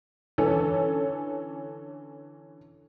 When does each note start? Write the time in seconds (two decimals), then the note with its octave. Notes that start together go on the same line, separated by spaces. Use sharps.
0.38 D3 E3 C#4 A4